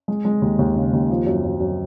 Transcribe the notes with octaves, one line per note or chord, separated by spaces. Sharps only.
G#3
G#3
D#2
D#2
C#3
D#2
F3
F#2
F#2
F#2